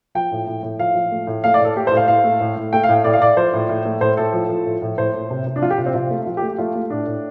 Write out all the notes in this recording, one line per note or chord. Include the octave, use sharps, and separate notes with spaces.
F3 G5
A2
A2
A2
F3 F5
F3
A3
A2
A3 F5
D5
A2 A4
A3 G4
C5
A2
F5
A2 F5
A3
A2
A2
A3 G5
F5
A2
A2 D5
F5
A2 D5
F3 C5
A2
A2
A3
A2 C5
A2 A4
F3
F3
A2
A2
A2 C5
A2
C3
C3
D4
F3 F4
G4
C3 F4
C4
C3 F4
A3
F3 F4
G4
A3
G4
A3 F4
A3
A2 D4
A2